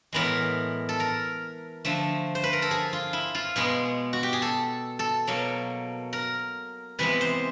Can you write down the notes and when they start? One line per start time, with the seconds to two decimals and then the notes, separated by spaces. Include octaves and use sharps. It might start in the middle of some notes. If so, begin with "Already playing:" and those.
0.13 A2 E3 G#3 B3 A#4
0.89 A4
1.00 A#4
1.85 D3 F3 A3
2.35 C5
2.44 B4
2.53 A#4
2.62 A4
2.71 G#4
2.93 F4
3.13 E4
3.35 F4
3.56 B2 G#3 B3 G#4
4.13 F#4
4.23 G4
4.33 G#4
4.42 A4
4.99 A4
5.27 B2 F#3 A#3
6.13 A#4
6.99 C3 E3 G#3 B3 B4
7.21 C5